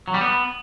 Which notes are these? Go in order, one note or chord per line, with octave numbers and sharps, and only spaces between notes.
F#3
G3
B3